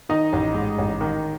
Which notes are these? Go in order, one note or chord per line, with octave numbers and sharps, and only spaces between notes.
D#3 D#4 D#5
A1
G#2
A1
D#3